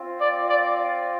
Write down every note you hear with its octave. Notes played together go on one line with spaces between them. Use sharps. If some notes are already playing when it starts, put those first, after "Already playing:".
Already playing: C4 F4
D5
D5